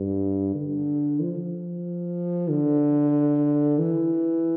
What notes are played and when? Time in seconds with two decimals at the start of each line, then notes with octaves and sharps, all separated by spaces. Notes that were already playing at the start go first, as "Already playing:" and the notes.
Already playing: G2
0.55 D3
1.20 F3
2.49 D3
3.79 E3